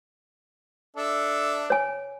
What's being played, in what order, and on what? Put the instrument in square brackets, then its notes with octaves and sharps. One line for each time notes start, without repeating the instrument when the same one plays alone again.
[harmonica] D4 A4 E5
[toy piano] C#5 G#5